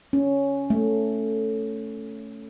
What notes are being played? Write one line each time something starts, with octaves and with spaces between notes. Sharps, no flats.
C#4
A3